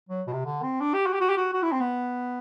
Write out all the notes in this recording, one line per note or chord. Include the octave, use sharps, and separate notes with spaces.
F#3
B2
C3
D3
C4
D4
G4
F#4
G4
F#4
G4
F#4
F#4
E4
C4
B3